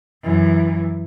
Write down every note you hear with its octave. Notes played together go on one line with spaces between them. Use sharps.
F#2 E3